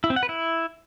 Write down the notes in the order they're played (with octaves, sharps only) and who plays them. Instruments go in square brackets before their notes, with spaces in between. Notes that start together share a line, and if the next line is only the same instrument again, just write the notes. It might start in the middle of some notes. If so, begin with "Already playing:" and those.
[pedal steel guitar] E4
C4
F#5
B4
E4